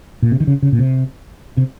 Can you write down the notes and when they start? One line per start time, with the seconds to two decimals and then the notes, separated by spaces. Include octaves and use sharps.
0.22 A#2
0.32 C3
0.40 D#3
0.47 C#3
0.62 C#3
0.72 A#2
0.79 C3
1.57 C3